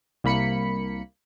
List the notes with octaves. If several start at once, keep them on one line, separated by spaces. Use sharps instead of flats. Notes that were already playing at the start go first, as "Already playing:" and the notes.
C2 A#3 B5 C#7